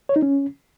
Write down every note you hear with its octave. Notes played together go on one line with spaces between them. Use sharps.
C#5
D#4
C#4